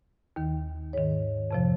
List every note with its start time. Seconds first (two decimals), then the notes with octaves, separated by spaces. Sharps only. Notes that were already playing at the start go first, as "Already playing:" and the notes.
0.36 D#2 D#3
0.93 G#2 D#3 C#5
1.51 F2 C3 F3